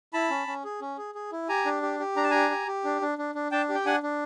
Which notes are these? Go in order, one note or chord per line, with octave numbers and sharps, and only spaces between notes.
E4 A5 B5
C#4
C#4
G#4
C#4
G#4
G#4
E4
G4 G#5 A#5
D4
G4
G4
D4 A#5
A5
G4 G#5 A#5
G4
G4
D4
D4
D4
D4
D4 G5 A5
G4
G5
D4 F#5 G#5
D4